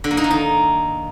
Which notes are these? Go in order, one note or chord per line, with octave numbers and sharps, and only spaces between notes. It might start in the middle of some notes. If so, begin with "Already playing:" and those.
D3
A#3
D#4
D#3
D#4